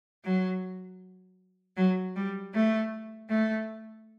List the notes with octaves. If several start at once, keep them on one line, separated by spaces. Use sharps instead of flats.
F#3
F#3
G3
A3
A3